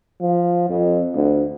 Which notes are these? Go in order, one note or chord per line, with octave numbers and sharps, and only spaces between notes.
F3
F2
D2